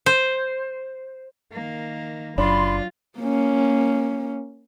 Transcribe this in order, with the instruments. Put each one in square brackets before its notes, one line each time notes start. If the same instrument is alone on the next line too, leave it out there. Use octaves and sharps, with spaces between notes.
[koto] C5
[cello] D#3 A#3
[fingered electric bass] F#1 [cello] F#3 F4 [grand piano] D4 [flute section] B5 C6
[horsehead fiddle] A#3 C#4